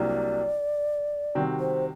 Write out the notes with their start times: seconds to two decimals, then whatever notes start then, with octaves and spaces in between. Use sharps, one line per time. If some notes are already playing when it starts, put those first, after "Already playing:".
Already playing: C2 C3 F#3 A#3 D4 D5
1.35 C3 D#3 G3 C4 F#4
1.59 C5